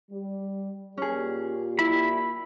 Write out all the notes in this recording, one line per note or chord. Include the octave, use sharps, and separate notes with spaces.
G3
A#2 C#4 G4 G#4
E4 B5